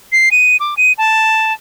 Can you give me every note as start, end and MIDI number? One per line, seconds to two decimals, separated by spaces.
0.12 0.29 96
0.32 0.57 99
0.60 0.75 86
0.77 0.93 99
0.98 1.53 81